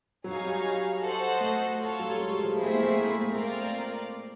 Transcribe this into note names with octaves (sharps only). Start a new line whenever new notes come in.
F#3 D#4 G#4 C#5 F5 G#5
G3
F#4 A4 C5 D#5 F#5
A3
F4 A4 C#5
F#3
G3
G#3
G3
F3
G#3 C4 E4 G#4 C5 E5
A3
A#3
A3
G#3
G#3
A#3
A3 C4 F4 A#4 D5 F5